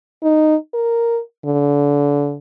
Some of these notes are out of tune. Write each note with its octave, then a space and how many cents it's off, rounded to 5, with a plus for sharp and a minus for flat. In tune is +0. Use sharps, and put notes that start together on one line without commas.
D#4 -10
A#4 -5
D3 -30